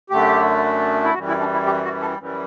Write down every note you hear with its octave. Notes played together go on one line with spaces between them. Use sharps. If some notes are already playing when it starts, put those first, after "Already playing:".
F#2 D3 A3 G4
E4
F#2 E3 G3 F#4
E4
D4
E4
G4
F#4
A4
F#2 E3 G3